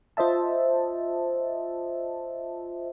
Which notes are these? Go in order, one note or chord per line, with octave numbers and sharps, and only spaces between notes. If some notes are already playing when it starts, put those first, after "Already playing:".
F4 C5 D#5 E5 A5